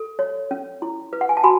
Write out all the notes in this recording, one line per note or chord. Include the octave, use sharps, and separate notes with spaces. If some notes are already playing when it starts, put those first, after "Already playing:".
Already playing: A4
C#5
C#4
E4
B4
F#5
G#5
A5
F#4 G#5 B5